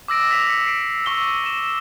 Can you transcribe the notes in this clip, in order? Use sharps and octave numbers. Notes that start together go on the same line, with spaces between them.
D6 E6 A#6 D7
B6 F7
E6 C#7
C7 D7
C#6 E6 G7
D6 E7